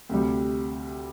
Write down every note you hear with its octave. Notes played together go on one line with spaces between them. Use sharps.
D2 C3 G3